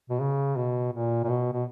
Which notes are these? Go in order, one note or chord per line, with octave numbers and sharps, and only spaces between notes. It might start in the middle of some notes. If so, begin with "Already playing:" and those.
B2
C#3
B2
A#2
A#2
B2
B2